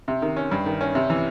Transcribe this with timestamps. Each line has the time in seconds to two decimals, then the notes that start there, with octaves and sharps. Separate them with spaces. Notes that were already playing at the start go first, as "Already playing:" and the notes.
0.08 C3
0.22 D#3
0.36 C#4
0.51 G2
0.66 D#3
0.81 C#4
0.95 C3
1.10 E3